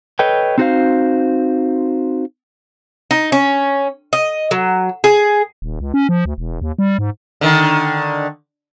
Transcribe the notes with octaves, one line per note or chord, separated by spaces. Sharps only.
A4 B4 C#5 D#5 G5
C4 D#4 F#4 A#4 C5 F5
D#4
C#4
D#5
F#3
G#4
D#1
C#2
C#4
F3
D2
E1
D#2
G3
G#2
D3 D#3